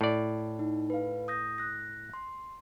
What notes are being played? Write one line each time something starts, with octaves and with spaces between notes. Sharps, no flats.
A2 D5
D#4
B4 F5
D#6 G6 A#6
F#6 A#6
C6